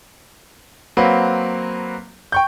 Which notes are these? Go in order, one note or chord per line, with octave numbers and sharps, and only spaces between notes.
F#3 A#3 C4 F#4 B4
G5 C#6 G6